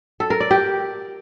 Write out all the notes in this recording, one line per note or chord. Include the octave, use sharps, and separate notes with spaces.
A4
A#4
D5
G4